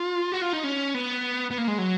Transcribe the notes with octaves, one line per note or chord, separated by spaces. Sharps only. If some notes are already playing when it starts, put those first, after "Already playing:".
Already playing: F4
F#4
F4
D#4
C#4
B3
B3
A#3
G#3
F#3